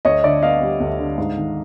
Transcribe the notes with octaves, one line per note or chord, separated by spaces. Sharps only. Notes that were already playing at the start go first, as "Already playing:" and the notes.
D2 C#5 D#5
D3 D5 E5
B3 D#5 F5
G3
D2
D3
G#2
D#3